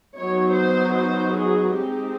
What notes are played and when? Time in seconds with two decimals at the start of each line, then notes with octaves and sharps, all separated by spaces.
0.17 F#3 B3 D#4 C#5
0.56 C5
0.97 C5
1.37 G#4
1.77 G#3 C4 D#4 G4